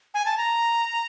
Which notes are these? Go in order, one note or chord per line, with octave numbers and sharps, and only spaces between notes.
G#5
A5
A#5